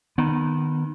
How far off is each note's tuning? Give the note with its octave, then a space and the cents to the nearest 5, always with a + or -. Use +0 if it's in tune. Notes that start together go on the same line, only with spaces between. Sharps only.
D#3 -20 B3 -5